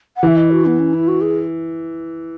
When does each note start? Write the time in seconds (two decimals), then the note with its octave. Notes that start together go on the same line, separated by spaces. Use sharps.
0.16 F#5
0.23 E3 E5
0.37 D#5
0.51 F#4
0.66 B3
0.79 C#4
0.94 E4
1.08 F#4
1.21 G#4